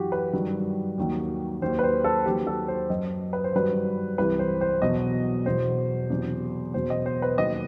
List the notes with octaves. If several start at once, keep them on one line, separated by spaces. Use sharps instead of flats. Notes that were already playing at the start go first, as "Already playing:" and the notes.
Already playing: F#2 E3 F#4 G4
B4
G2 D#3 F#3
D#2 D#3 F#3
D#2 D#3 F#3 C5
B4
C5
A4
D#2 D#3 F#3 G4
A4
C5
F#2 F#3 D#5
B4
C5
G2 D#3 F#3 B4
C2 C3 E3 B4
C5
C5
E2 B2 F#3 D#5
E2 B2 F#3 C5
E2 C3 F#3
E2 B2 F#3 C5
D#5
C5
B4
D#2 D#3 F#3 D#5